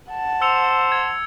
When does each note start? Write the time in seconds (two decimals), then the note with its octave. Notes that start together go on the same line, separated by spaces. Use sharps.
0.11 F#5 A5
0.42 C5 E6 C#7 F7
0.92 G#6